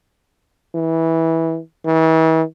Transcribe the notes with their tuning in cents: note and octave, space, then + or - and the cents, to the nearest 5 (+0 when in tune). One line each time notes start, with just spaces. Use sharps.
E3 -15
E3 -40